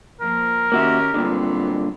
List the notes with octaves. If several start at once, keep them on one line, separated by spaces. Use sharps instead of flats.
F3 A#3 A#4
D#3 A#3 C#4 F#4 G4 E5
G2 A#2 D3 F#3 B3 C4